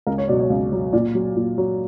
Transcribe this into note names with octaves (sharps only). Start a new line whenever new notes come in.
C#2 A#4
C#5
B2 F#3 D5
C#5
C#2
B2 F#3
A#2 D5
F#3
A#2
F#3